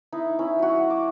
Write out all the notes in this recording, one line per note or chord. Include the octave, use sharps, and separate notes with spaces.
D#4 E4
C#4 E4
F#3 F#4
D6